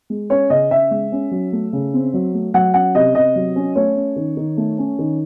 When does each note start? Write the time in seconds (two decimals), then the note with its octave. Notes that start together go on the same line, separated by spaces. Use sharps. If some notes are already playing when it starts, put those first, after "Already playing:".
0.10 G#3
0.30 C#4 C#5
0.50 C#3 D#5
0.71 C#3 E5
0.91 G#3
1.12 C#4
1.31 F#3
1.53 A3
1.73 C#3
1.94 C4
2.14 F#3
2.34 A3
2.54 F#3 F#5
2.74 C#4 F#5
2.95 C3 D#5
3.15 C3 D#5
3.35 F#3
3.56 C#4
3.76 A3 C#5
3.96 C#4
4.16 D#3
4.37 D#3
4.57 A3
4.78 C#4
4.99 D#3